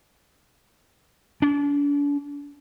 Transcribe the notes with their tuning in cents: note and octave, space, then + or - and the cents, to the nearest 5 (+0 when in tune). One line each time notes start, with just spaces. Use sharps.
D4 -40